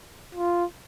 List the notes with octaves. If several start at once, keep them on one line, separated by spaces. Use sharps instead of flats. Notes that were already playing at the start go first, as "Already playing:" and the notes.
F4